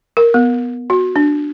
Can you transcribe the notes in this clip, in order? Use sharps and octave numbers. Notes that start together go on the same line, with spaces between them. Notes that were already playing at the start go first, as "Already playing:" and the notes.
A#4
B3
F#4
D4